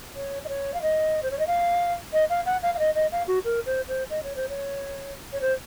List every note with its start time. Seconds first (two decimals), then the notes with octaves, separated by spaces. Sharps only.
0.16 C#5
0.44 D#5
0.49 C#5
0.74 F5
0.82 D#5
1.23 C5
1.31 C#5
1.39 D#5
1.47 F5
2.13 D#5
2.29 F5
2.46 F#5
2.62 F5
2.74 F5
2.79 D#5
2.95 D#5
3.12 F5
3.27 F#4
3.44 A#4
3.66 C5
3.88 C5
4.10 D#5
4.23 C#5
4.36 C5
4.49 C#5
5.33 C#5
5.41 C5